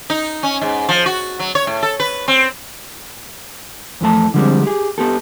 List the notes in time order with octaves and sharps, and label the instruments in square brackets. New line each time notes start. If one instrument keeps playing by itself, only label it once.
[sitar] D#4
C#4
G#2
F3
F#4
F#3
C#5
A2
A4
B4
C4
[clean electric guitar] F2 E3 A3 A5
D3 F3 G3 G#3 C4
G4 G#4
B3 G4 A4